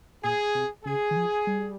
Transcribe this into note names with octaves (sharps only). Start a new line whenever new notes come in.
A#2 G#4
C3
C#3 G#4
D#3
F3
G3